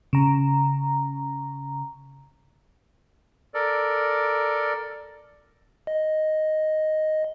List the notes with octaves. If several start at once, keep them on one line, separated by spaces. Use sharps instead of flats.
C#3 A#5
A4 A#4 D5
D#5